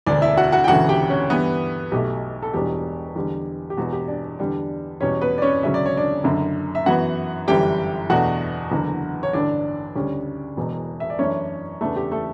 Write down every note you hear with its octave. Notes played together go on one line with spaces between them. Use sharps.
E1 D2 D3 D4 D5
E4 E5
F#4 F#5
F#4 F#5
G5
E1 D2 C#3 E3 A3 F#4 F#5
G4 G5
C#4 C#5
G2 E3 G3 B3 B4
B1 B2 A3 G4
A4
E1 E2 B2 G3 D4 G4
E2 D3 G3
G4
E1 E2 B2 F#4
G4
D4 D5
E2 D3 G3 D4
E2 B2 G3 C#4 C#5
B3 B4
D5
C#4 C#5
E1 D2 C#3 F#3 C#4 E5
D5
C#5
D4 D5
F#1 F#2 D3
E5
F#2 E3 B3 F#4 F#5
G1 F#2 E3 G3 G4 G5
E2 B2 A3 D4 F#4 F#5
F#1 E2 D3
C#5
A1 G2 D3 D4 D5
D2 C#3 G3 C#4
E1 E2 B2
E5
D5
F#2 E3 A3 C#4 D4 C#5
E2 C#3 E3 A3 B3 D4 A4
G4
A3 A4